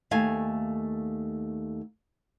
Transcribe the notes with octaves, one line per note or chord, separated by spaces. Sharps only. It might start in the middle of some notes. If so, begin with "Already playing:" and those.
D#2 A3 F5 G#5